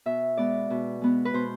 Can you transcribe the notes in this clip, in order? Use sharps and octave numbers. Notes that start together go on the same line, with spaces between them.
B2 E5
G#3 B3 D5
B2
G#3 B3
B4
B2 C5